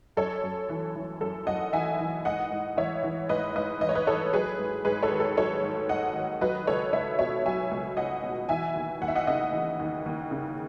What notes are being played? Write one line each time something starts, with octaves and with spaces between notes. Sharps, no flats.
F#2 A4 C#5
F#2
E3
E3
F#2 A4
F#2 D#5 F#5
E3 E5 G#5
E3
G#2 D#5 F#5
G#2
E3 C#5 E5
E3
G#2 B4 D#5
G#2 B4 D#5
E3 D#5
C#5
B4 D#5
E3 A4 C#5
F#3 G#4 B4
G#2
G#2 G#4 B4
A4 C#5
D#3
A4
F#3 A4 C#5
G#2
G#2 D#5 F#5
D#3
F#3 B4 D#5
C#2 A4 C#5
C#2 C#5 E5
B2 C#5 E5
F#3 E5 G#5
C#2
C#2 D#5 F#5
B2
E3 E5 G#5
D#2
D#2 F#5
E5
D#5 F#5
C#3 D#5 F#5
E3
D#2
D#2
C#3